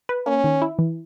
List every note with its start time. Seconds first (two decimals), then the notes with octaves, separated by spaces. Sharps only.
0.09 B4
0.26 A#3 C#4
0.44 D#3
0.62 E4
0.79 E3